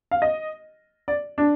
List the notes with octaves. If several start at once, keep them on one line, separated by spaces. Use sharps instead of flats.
F5
D#5
D5
D4